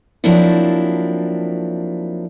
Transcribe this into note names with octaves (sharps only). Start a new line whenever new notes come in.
F3 F#3 A#3 C4 D4 E4